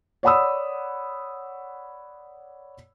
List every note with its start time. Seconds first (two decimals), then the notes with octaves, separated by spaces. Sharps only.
0.23 C#5 D5 F#5 B5 D#6 E6